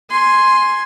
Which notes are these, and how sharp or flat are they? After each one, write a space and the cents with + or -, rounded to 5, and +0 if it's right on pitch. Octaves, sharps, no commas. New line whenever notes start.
G#5 +0 C6 +5